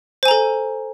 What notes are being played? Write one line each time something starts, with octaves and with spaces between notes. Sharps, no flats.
A4 C5 G#5 A#5